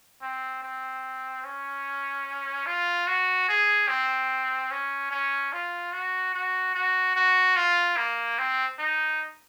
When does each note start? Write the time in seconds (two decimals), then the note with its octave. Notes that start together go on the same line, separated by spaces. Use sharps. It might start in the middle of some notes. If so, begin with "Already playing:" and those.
0.22 C4
0.63 C4
1.44 C#4
2.67 F4
3.07 F#4
3.49 G#4
3.89 C4
4.71 C#4
5.11 C#4
5.53 F4
5.93 F#4
6.34 F#4
6.75 F#4
7.16 F#4
7.56 F4
7.97 A#3
8.39 C4
8.79 D#4